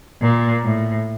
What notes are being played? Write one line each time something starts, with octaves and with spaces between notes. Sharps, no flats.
A#2
A2